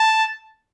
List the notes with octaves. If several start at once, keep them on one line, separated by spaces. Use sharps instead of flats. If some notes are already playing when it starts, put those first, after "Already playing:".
Already playing: A5